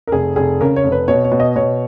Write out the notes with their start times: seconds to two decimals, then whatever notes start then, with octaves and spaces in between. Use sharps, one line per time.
0.07 A#4
0.12 F1 G#4
0.36 F1 G#4
0.61 C#3 A#4
0.76 C#5
0.84 F1
0.92 B4
1.08 B2 C#5
1.24 C#5
1.32 B2
1.40 D#5
1.56 B2 C#5